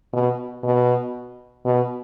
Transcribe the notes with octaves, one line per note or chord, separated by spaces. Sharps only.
B2
B2
B2